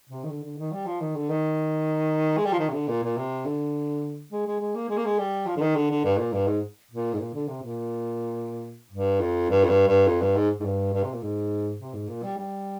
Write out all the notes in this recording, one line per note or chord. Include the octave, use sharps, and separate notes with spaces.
C3
D#3
D3
D3
D#3
G3
F3
D#3
D3
D#3
G#3
G3
F3
D#3
C3
D3
A#2
A#2
C3
D3
G#3
G#3
G#3
A#3
G#3
A#3
G#3
G3
F3
D3
D#3
D3
D3
G2
A#2
G2
G#2
A#2
G#2
A#2
D3
C3
A#2
G2
F2
G2
F2
G2
G2
F2
G2
G#2
G#2
G2
G2
C3
A#2
G#2
C3
G#2
A#2
G3
G3